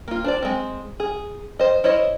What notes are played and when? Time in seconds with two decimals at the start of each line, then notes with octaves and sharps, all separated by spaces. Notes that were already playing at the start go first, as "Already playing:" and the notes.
0.08 A#3 F4
0.24 D4 C5 D5
0.43 G#3 C4
1.00 G#4
1.59 C5 D#5
1.84 E4 C5 C#5 D#5